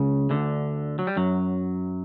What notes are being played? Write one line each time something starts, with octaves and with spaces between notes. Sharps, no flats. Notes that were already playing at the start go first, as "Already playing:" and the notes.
Already playing: C#2 C#3
D2 D3
F#3
G3
F#2 F#3